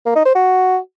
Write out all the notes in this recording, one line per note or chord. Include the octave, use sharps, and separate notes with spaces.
A#3
D#4
C5
F#4